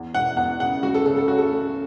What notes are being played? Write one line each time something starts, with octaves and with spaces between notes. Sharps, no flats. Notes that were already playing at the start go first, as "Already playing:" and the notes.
Already playing: E2
E1 F#5
E2 F#5
C#3 F#5
C#2 F#4
A4
C#3 A4
A4
C#4 F#4
A4
A3